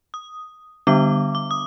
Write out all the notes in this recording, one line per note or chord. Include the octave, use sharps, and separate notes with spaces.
D#6
D3 G3 B3 D4 D6
D6
D#6